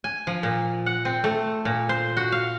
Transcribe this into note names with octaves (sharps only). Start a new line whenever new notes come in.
G#5
F3
A#2
F#5
C4
A3
A#2
C5
F#4
F5